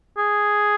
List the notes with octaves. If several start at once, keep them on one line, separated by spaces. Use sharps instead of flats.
G#4